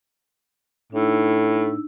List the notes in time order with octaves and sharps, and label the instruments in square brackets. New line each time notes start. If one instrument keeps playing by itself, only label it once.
[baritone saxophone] A2 [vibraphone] D4 D#4 E6